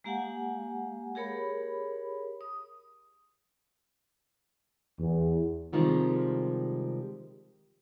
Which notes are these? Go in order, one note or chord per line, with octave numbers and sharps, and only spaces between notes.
G#3 A#3 G4 F5 F#5 G#5
G4 G#4 A#4 C#5 B5
D#6
E2
C3 D#3 F3 G3 G#3